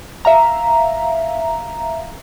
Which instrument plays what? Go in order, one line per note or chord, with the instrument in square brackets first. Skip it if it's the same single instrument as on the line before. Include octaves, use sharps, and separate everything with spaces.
[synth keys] E5 F5 A#5